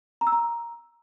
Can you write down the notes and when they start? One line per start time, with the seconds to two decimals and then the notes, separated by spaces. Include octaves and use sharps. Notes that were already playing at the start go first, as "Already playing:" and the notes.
0.21 A#5
0.27 E6
0.32 A#5